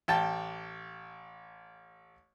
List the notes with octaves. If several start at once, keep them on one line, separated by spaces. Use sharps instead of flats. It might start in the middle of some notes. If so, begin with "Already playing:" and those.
A1 G5 A5